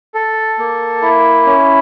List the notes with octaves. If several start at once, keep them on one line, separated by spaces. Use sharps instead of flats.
A4
A#3
E4
C#4